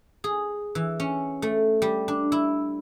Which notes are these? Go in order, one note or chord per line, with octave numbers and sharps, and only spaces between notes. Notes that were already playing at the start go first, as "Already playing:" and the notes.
G#4
E3
C#4
A3
G3
D4
E4